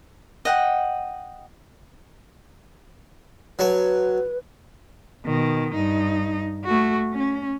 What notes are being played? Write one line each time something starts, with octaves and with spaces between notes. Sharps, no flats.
D#5 F#5 G5
F#3 B4 C#5 A5
B2 D#3
G2 D#4
A3 F#4
C#4